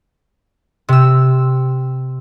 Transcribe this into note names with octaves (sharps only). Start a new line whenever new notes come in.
C3 E6